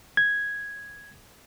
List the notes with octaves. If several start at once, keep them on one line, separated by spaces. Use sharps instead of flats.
G#6